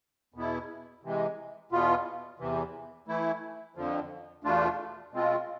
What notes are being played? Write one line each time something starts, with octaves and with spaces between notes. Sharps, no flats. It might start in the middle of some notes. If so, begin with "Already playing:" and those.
E2 B2 B3 E4
C3 E3 G#3
E2 B2 B3 F4
E2 C3 E3
E3 A3 E4
F2 D3 F3
E2 B2 A3 D4 F4
B2 G#3 C4 F4